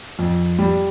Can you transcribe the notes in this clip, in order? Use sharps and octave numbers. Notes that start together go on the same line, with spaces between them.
F2
G3